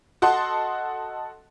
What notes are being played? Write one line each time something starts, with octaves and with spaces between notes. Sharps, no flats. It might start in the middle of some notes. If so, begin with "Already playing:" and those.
F#4 A4 D#5 F#5 A5 C6